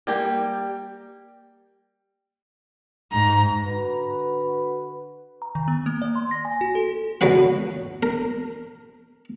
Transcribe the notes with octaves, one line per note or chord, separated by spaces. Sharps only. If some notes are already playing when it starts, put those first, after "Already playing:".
G3 A#3 G4
G#2 A#5
D3 F#4 B4
A#5
D#3
B3
A#3
D5
C6
A#6
G#5
F#4
A4
C#2 F#3 F#4 B4 F#5
A#4